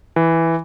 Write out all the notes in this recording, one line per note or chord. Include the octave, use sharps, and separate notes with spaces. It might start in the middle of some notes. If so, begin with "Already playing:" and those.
E3